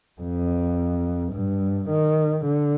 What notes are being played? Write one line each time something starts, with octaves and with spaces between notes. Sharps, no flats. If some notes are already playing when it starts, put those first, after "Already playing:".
F2
G2
D#3
D3